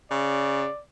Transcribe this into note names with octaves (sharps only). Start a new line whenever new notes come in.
C#3 D5